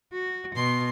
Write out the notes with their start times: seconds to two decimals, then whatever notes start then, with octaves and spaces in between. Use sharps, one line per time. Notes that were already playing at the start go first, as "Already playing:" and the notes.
0.13 F#4
0.55 B2 C6